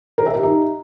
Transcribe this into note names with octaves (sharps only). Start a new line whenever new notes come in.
A#4
E5
G4
D#4